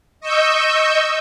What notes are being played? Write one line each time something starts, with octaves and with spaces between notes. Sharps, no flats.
D#5 C#6 E6 G6